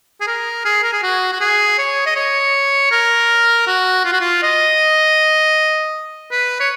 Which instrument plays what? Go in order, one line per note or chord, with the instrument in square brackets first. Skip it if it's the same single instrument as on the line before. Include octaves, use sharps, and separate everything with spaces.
[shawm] G#4
A#4
G#4
A#4
G#4
F#4
F#4
G#4
C#5
D#5
C#5
A#4
F#4
F4
F#4
F4
D#5
B4
C#5